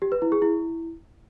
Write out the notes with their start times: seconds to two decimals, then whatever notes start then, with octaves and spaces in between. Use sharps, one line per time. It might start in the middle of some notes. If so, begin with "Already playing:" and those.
0.02 G4
0.12 B4
0.22 E4
0.32 G#4
0.42 E4